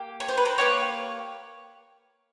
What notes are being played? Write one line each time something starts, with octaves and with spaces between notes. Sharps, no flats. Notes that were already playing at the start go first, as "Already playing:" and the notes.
Already playing: A#3 G4
C#5
C5
B4
A#4 C5
A#3 D#4 G4 B4 C#5